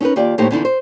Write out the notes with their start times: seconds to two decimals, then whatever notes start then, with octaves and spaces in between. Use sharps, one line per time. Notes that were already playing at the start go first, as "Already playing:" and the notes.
0.01 C#4 D#4 G4 A#4 B4
0.16 D#2 F4 G4 D5
0.38 D#2 A2 D#4 G4 C5 C#5
0.51 E2 D3 D#4 E4
0.65 C5